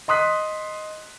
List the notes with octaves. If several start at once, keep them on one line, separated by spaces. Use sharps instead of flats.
D#5 C6 D#6 F#6 B6